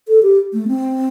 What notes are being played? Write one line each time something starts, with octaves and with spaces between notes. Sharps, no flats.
A4
G4
A3
C4